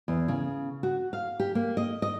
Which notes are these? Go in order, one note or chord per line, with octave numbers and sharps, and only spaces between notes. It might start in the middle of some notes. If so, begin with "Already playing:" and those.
E2
C#3
F#4
F5
G4
A#3
D#5
D#5